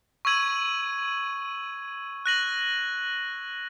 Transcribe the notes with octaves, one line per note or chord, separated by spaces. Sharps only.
C#6 E6 G#6 D#7 F#7
F#6 A#6 D#7 F#7